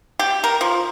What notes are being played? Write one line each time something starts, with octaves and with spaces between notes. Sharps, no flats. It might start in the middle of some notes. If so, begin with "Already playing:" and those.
G4
A#4
F3